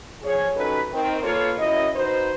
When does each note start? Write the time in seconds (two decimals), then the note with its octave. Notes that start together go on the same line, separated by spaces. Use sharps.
0.22 F3 G#4 C#5
0.54 G2 F#3 C#4 D#4 A4 B4
0.92 D#3 C4
1.22 A#3 F4 A4 B4 C#5
1.57 F#2 E4 D#5
1.94 D#4 F#4 B4 C5